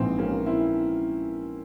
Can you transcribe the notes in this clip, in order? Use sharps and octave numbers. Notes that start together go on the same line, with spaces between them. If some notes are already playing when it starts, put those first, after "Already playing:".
Already playing: A#1 G#2 E3 C4
A#3 C#4
C4 E4